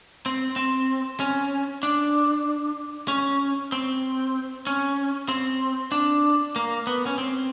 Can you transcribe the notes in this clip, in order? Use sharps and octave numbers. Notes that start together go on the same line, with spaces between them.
C4
C4
C#4
D4
C#4
C4
C#4
C4
D4
A#3
B3
C#4
C4